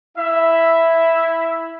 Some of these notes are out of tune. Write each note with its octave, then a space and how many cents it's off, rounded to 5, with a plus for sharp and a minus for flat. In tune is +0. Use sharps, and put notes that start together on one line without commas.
E4 +0 E5 +0